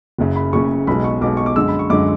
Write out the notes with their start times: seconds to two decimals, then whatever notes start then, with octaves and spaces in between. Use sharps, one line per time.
0.18 F#1 F#2 C#3
0.36 B5
0.53 F#1 F#2 C#3 C#6
0.87 B1 B2 G#3 B5
1.04 C#6
1.21 B1 B2 G#3 D6
1.37 C#6
1.46 D6
1.56 F#2 D3 G#3 E6
1.68 B5
1.79 C#6
1.90 F#2 D3 G#3 D6